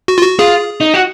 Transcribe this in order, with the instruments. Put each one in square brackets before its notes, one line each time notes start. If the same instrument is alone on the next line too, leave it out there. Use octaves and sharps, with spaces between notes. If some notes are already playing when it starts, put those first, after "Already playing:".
[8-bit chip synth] F#4
F4
F#4
[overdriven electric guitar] F4 [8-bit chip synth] G#4
[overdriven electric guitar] D#4
F#4